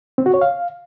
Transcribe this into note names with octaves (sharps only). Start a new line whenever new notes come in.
C4
F#4
C#5
F5